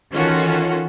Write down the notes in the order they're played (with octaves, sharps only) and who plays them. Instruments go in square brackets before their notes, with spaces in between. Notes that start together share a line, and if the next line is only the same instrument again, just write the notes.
[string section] D#3 E3 C#4 F4 F#4 A4